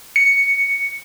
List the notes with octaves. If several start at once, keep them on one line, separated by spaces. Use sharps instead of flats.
C#7